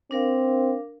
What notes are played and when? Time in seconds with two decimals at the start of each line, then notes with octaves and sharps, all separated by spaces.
0.11 C4 D4 A#4 F5